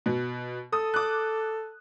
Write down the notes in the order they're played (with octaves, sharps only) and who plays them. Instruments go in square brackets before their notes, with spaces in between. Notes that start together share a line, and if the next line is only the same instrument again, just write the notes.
[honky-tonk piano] B2
[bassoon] A4 [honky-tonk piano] D#6
[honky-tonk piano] D6 F#6